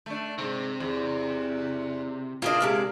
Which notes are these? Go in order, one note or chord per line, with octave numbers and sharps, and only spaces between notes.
A3 D4
G#2 C3
E2
A#3 D4 F4 G#4 D#5
C3 G#3 F5